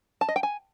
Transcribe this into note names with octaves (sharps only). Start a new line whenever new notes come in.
A5
D#5
G5
G#5